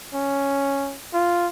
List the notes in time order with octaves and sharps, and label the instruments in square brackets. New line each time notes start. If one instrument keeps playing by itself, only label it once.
[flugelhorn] C#4
F4